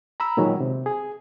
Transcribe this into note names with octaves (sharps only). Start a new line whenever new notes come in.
A#5 B5 E6
A#2 D#3 F#3 G#3
C3
G#4